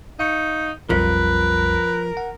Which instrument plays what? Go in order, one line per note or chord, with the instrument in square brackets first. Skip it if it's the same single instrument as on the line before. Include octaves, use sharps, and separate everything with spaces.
[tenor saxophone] D#4 [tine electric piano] F5 C#6 C#7
[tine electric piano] B1 F2 G3 [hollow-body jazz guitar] F3 [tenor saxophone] A#4 [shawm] B4
[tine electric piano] F#5